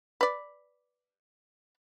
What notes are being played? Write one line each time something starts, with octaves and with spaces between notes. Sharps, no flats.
B4 D5